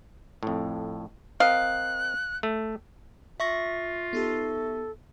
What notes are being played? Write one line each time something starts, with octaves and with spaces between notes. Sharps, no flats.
F2 A2
C4 A#4 D#5 F5 F#6
A3
F4 E5 C#6 A#6
B3 D#4 G4 A4